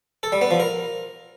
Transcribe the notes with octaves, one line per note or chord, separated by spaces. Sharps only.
A4
G3
B3
F3
A#4